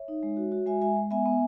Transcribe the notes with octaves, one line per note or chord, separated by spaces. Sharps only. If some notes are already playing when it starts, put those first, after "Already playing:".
Already playing: C#5 E5
D#4
G#3
F#4
F#4
G#3 E5 G#5
G#3 E5 G#5
G#3
B3 E5 G#5
B3